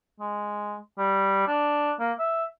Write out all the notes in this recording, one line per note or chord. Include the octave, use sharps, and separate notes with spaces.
G#3
G3
D4
A#3
E5